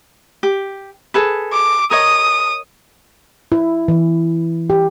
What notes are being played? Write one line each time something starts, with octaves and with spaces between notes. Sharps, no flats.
G4
G#4 A4 B4
D6
A#4 C#5 D#5 D#6
E4
E3
G4